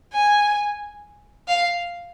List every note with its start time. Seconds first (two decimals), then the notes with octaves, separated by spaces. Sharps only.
0.13 G#5
1.48 F5